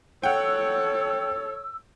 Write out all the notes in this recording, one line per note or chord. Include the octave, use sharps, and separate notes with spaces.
A4 C#5 F#5 G5 E6